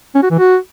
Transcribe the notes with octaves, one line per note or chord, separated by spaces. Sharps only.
C#4
F#4
E3
F#4